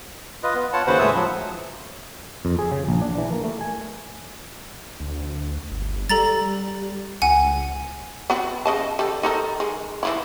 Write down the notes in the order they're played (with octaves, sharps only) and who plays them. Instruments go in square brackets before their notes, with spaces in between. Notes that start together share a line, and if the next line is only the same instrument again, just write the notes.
[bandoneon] F4 B4 D#5
B3
F4 C#5 F#5 A5
D#2 C#3 F#4 B4 C5 F#5
A2 G#3 C#5 E5 D#6 E6
F3 F#3
[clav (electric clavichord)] F2
G#4
C#3
A#1
D4
E3
A#3
A3
G#5
[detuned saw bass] D2
G1
[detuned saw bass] G3 [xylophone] A4 A#5 A6
[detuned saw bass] C#2 [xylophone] F#5 G#5
[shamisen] B3 C4 F#4
C#3 D#5 A5
G3 A4
D#4 A4 A#4
G#3
E3 F3 E4